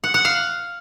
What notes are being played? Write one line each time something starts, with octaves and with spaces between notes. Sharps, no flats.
F#5
F#5
F5